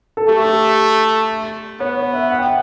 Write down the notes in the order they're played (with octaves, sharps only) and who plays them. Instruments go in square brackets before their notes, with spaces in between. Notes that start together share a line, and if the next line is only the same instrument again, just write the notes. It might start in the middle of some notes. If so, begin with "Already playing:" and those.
[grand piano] A4
[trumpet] A3 [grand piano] G4
[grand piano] G4
[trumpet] B3 [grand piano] C#5
[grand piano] C#5
E5
F#5
G5
F#5